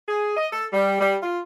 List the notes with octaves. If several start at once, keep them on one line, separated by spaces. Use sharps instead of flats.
G#4
D#5
A4
G3
G3
F4